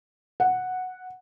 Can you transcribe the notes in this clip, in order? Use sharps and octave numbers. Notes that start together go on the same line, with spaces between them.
F#5